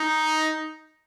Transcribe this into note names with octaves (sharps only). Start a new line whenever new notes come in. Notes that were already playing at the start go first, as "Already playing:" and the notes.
Already playing: D#4